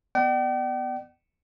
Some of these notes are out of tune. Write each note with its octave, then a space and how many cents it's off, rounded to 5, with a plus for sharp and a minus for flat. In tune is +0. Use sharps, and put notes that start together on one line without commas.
B3 +0 D5 +35 G5 -40